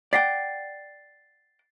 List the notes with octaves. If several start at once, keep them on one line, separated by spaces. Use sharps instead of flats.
D5 F#5 G5 A6 B6 C7